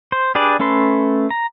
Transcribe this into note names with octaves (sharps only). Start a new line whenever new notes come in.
C5
D4 G4 G#4 B4 D5
A3 C#4 A4 B4 C6
A#5